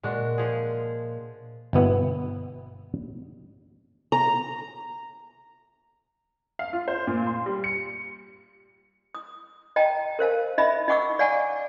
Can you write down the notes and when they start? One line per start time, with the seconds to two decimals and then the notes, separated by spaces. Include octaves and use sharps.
0.03 A#2 G#3 D4 F#4
0.38 F3 G#4
1.73 G1 B2 B3 E4
4.12 A#5
6.59 F5
6.73 F4
6.88 C5
7.07 A#2
7.27 C6
7.46 G3
7.64 C#7
9.15 D#6
9.76 D#5 G5 A5 A#5
10.19 A#4 C5 F5 A5
10.58 D#4 D#5 E5 B5
10.88 D#4 D#5 F#5 C#6 D6 E6
11.19 D5 F5 F#5 G#5 A5 C#6